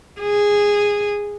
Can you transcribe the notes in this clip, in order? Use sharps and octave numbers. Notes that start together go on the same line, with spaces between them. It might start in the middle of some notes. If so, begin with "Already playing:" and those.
G#4